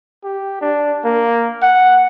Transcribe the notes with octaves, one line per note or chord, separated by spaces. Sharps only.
G4
D4
A#3
F#5